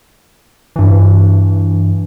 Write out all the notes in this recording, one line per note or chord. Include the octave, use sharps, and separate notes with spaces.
G2 E3